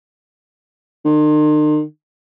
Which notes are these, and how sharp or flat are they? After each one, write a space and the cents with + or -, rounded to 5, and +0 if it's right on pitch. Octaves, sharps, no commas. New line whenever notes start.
D#3 -45